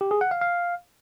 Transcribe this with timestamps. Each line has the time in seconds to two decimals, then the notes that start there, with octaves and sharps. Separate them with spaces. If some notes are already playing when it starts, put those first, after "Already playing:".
0.01 G4
0.11 G#4
0.21 F#5
0.31 F5
0.41 F5